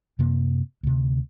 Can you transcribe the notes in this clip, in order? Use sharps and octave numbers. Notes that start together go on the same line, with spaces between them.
F#2 C3 A#3
D2 C3